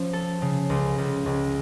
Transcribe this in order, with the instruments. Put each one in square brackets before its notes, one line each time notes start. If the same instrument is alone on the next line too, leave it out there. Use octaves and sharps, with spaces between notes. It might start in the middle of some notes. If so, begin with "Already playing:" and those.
Already playing: [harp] F3 C#4
A4
C#3
C#2
C#2
C#2